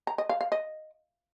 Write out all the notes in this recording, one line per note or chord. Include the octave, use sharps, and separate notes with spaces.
A#5
D#5
F5
F5
D#5